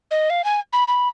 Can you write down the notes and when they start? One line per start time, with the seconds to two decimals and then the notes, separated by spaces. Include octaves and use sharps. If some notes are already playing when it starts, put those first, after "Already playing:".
0.11 D#5
0.30 F5
0.44 G#5
0.73 B5
0.88 B5